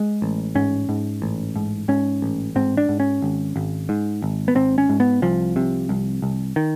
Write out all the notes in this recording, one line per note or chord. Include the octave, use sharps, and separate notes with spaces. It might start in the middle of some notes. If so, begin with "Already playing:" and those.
Already playing: G#3
A1
G#2 C#4
G#2
A1
G#2
G#2 C#4
A1
G#2 C4
D4
G#2
C#4
G#1
G#1
G#2
G#1
B3
G#1 C4
C#4
G#2
B3
C2 F3
C3
C2
C2
D#3